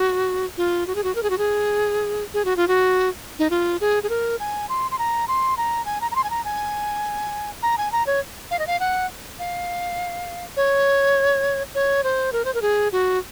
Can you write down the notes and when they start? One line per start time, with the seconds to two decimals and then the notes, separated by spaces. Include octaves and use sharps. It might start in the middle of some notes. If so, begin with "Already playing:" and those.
Already playing: F#4
0.57 F4
0.87 F#4
0.95 G#4
1.04 F#4
1.15 A#4
1.23 G#4
1.30 F#4
1.38 G#4
2.34 G#4
2.45 F#4
2.57 F4
2.68 F#4
3.39 D#4
3.50 F4
3.81 G#4
4.03 G#4
4.10 A#4
4.40 G#5
4.69 C6
4.91 C6
4.99 A#5
5.28 C6
5.57 A#5
5.86 G#5
6.01 A#5
6.11 A#5
6.16 C6
6.24 G#5
6.30 A#5
6.45 G#5
7.63 A#5
7.78 G#5
7.92 A#5
8.07 C#5
8.51 F5
8.59 D#5
8.67 F5
8.80 F#5
9.39 F5
10.57 C#5
11.75 C#5
12.04 C5
12.33 A#4
12.45 C5
12.54 A#4
12.62 G#4
12.92 F#4